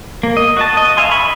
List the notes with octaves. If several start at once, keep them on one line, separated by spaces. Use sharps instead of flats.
A#3
D#5
F#4 D#5 A5
D#5
E5 F5 G#5 C6
B5 C#6